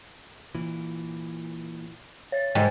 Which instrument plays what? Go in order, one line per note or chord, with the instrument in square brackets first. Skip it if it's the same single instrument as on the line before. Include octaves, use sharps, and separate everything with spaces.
[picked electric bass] A#2 E3
[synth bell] C#5 A6
[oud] G#2 [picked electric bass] D#3 G3 A3 [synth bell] G5